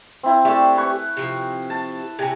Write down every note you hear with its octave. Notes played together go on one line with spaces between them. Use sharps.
C4 E4
A3 D4 G4 A4
B4 G#5 C#6
C3 F3
A5
C3 C#4 G#5